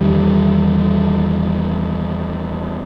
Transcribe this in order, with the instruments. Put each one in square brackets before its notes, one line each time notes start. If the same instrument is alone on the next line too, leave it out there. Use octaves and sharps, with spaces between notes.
[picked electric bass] E2 D#3 G3